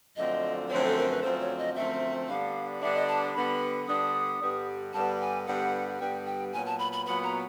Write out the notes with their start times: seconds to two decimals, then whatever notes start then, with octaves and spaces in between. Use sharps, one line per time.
0.16 F#2 D3 F3 A3 C4 D#5
0.69 F#2 D3 F3 A3 C4 C#5
0.86 A4
0.98 A#4
1.10 B4
1.22 F#2 D3 F3 A3 C4 C5
1.40 C#5
1.58 D#5
1.76 F#2 D3 F3 A3 C4 E5
2.28 D3 G3 B3 D4 F5
2.82 D3 G3 B3 D4 E5
2.95 D#5
3.08 A5
3.34 D3 G3 B3 D4 B5
3.87 D3 G3 B3 D4 D#6
4.41 G2 D3 G3 B3
4.93 G2 D3 G3 B3 A5
5.20 G#5
5.46 G2 D3 G3 B3 F#5
6.00 G2 D3 G3 B3 G5
6.26 G5
6.53 A#2 F#3 B3 G#5
6.66 A5
6.79 B5
6.93 B5
7.06 A#2 F#3 B3 B5
7.24 A#5